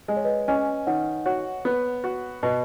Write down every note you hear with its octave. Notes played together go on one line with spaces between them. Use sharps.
G#3 D#5
C#5
B4 D#5
C#4 D#5 G#5
D#3 C#5 F#5
F#4 C#5 F#5
B3
F#4
B2 B4 D#5